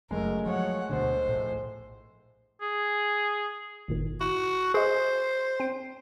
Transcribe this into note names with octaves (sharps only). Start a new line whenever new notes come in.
F#1 F#2 G#3 A3 A#4
F3 F#3 C#5 F#5
D2 B2 D3 C5
A#1 A2
G#4
G1 A#2 D#3
E4 F#4
G#4 C5 D#5
C4 D7